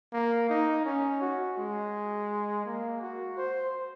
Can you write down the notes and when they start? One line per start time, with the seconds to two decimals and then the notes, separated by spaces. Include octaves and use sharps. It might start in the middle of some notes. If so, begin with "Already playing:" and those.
0.13 A#3
0.49 D#4
0.85 C#4
1.21 F#4
1.57 G#3
2.65 A#3
3.01 F#4
3.37 C5